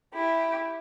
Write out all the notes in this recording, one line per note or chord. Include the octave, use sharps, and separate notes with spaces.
E4 G4